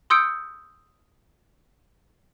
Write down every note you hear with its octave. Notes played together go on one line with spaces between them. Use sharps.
C6 D#6 E6 G6 C#7 D7